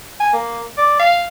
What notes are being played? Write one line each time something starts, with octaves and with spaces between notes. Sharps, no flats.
G#5
A#3
D5
F5